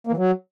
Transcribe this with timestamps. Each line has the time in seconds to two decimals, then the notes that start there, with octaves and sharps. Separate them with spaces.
0.07 A#3
0.12 E3
0.17 F#3